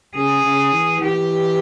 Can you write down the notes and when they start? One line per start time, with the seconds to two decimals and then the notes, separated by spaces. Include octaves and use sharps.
0.15 C#3 G#4
0.44 C#3
0.72 E3
1.01 E3 G4